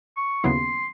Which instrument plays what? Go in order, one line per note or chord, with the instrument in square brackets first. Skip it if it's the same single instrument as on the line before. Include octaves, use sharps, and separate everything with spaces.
[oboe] C#6
[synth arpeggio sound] D#2 C#3 F#3 B3 E4 [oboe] C6